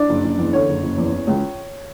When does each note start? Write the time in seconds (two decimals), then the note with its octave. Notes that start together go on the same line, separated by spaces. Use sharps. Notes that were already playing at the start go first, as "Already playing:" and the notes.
Already playing: D4 D5
0.09 F#1
0.24 F#1
0.38 E2
0.53 D3 C#5
0.69 F#1
0.83 F#1
0.98 E2
1.12 E3
1.27 C#2